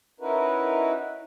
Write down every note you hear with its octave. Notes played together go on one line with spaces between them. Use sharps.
C#4 D#4 E4 F#4 A#4 B4